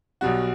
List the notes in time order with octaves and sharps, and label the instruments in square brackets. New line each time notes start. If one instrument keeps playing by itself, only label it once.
[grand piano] B1 B2 G3 F#4